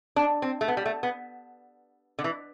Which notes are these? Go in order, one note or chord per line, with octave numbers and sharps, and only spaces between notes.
D4
C4
A3
B3
G3
A3
B3
D3
E3